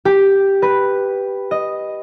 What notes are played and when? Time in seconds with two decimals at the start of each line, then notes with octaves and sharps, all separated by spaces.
0.05 G4
0.62 B4
1.51 D#5